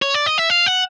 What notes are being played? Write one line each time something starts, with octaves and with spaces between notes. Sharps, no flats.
C#5
D5
D#5
E5
F5
F#5